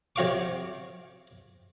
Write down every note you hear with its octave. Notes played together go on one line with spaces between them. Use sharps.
C3 F#3 F#4 F5 C#6 D6